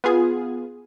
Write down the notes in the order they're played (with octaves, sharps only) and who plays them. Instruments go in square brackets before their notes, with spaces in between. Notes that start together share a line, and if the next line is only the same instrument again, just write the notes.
[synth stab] B3 F4 G#4